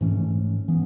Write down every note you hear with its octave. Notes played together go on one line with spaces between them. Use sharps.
G#2 E3 A3 C#4
E3 B3